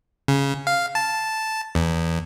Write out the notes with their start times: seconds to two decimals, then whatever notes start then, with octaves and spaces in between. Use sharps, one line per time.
0.28 C#3
0.67 F5
0.95 A5
1.75 E2